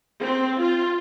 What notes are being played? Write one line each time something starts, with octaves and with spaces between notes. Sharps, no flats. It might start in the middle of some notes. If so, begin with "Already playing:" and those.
C4
F4